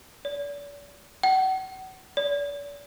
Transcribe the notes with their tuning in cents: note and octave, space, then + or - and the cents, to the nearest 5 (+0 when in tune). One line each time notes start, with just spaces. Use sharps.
D5 -40
F#5 +35
D5 -40